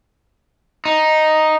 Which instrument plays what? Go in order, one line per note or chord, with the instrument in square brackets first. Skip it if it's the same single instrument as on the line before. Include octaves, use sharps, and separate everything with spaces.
[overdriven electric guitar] D#4